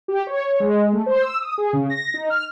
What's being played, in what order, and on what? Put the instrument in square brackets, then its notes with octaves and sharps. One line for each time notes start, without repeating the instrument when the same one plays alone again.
[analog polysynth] G4
C#5
G#3
A3
C5
E6
D#6
G#4
C#3
A#6
D#4
F6